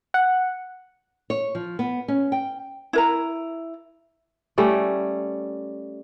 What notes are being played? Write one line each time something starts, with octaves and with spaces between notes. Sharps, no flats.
F#5
C#5
F3
B3
C#4
G5
E4 A#4 A#5
G3 A3 C#4